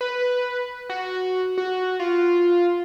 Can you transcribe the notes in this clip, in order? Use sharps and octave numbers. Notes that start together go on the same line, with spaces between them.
B4
F#4
F#4
F4